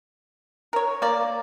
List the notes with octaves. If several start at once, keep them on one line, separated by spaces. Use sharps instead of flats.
A#4 C#5
A#3 D5